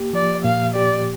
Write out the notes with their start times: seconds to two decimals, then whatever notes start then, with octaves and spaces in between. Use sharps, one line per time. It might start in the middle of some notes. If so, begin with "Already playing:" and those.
Already playing: A#3 G4
0.13 F3 D5
0.44 A#2 F5
0.75 G4 D5